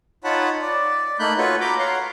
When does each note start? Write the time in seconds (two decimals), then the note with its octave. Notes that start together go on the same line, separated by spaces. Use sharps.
0.24 D#4 F4 C#5 F#5 A5 B5
0.62 D5
1.19 A3 A#3 D#4 B5 F#6 G6
1.38 F4 F#4 A4 B4 C#5
1.61 A#5 B5 D6 G6
1.79 C#5 F5 F#5 A#5 C6